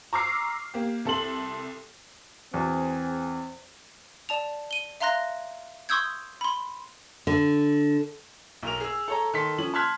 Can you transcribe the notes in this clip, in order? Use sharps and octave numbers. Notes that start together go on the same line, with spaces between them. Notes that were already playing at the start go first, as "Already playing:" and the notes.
A#5 C#6 D6 E6 F6 C7
A#3 G4
C2 A4 C6 F#7
E2 C4 F#4 G#4
D5 A5 F7
D#7 G7
E5 F5 A#5 C6 F#6 A#6
C6 C#6 D#6 E6 G6 G#6
B5 C6
D3
B1 A#4 F7
G#4 E6
A4 C#5 A#5
D#3 A4 C6 B6
F3 C#4 F#7
A5 C6 F6 F#6 G#6 B6